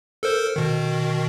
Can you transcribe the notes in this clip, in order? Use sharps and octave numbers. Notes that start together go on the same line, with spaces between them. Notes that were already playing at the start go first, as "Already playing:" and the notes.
A4 A#4 C5
B2 D#3